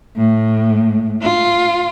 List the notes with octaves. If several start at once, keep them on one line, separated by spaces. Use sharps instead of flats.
A2
F4